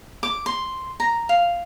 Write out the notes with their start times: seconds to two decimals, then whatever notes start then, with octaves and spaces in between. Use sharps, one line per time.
0.23 D6
0.46 C6
1.00 A#5
1.29 F5